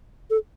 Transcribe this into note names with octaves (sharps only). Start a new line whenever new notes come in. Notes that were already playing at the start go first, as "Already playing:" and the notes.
A4